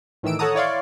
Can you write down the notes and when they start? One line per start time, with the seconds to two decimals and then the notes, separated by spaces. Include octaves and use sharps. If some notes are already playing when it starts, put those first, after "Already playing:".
0.23 A2 D#3 E3 E6 D7
0.39 A4 C#5 F#5 A5 A#5 D#6
0.55 E4 C#5 D5 F5 C6